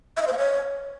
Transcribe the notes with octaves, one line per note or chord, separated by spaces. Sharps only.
E5
D#5
C5
F5
C#5